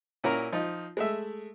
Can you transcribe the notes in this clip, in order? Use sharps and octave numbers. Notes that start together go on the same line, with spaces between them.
A#2 C#4 E4 F#4 A#4 A#5
F3 D#4 F4
G#3 A3 E5